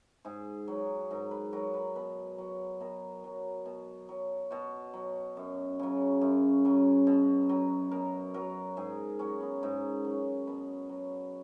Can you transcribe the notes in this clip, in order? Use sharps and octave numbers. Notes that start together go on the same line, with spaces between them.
G#2 G#4
F#3
G#2 A#4
B4
F#3 A#4
B4
B2 B4
F#3
B2 A#4
F#3
B2
F#3
B2 F#4
F#3
F#2
C#3 F#3
F#2
C#3 F#3
B2
F#3
B2 A#4
F#3 A#4
G#2 G#4
F#3 C#4
B3
G#2 A#4
F#3
B2 B4
F#3